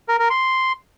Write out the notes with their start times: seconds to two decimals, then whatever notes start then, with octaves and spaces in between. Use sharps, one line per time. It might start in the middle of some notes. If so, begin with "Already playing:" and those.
0.08 A#4
0.19 A#4
0.30 C6